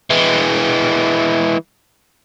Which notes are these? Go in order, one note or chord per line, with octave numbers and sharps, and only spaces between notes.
E3 G#3